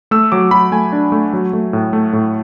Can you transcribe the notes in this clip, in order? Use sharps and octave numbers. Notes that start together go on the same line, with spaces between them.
A3 E6
F#3 D6
F#3 B5
A3 G#5
D4
A3
F#3
A3
A2
A3
A2